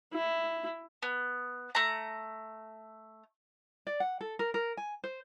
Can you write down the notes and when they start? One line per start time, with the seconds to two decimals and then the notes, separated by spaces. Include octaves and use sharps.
0.14 E4
1.03 B3
1.75 A3 A#5
3.87 D5
4.00 F#5
4.21 A4
4.39 A#4
4.54 A#4
4.77 G#5
5.04 C5